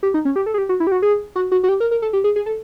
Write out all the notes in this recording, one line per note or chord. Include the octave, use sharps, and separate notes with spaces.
G4
D#4
C#4
G4
A4
G#4
G4
F#4
E4
G4
F#4
G#4
F#4
F#4
F#4
G4
A#4
A#4
A4
G4
G#4
G#4
A4